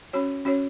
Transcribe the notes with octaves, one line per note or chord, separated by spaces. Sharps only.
C#4 F#4 C#5
C#4 F#4 C#5